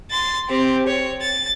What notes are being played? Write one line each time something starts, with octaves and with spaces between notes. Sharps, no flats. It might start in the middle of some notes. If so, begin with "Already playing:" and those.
C6 A6
C4 G4
C#5
A6